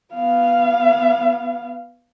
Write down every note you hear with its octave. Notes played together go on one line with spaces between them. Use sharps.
B3 F5